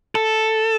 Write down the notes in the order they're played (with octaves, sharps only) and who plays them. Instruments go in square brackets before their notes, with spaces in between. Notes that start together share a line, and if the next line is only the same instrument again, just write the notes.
[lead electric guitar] A4